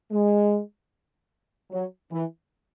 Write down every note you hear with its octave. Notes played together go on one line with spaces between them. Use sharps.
G#3
F#3
E3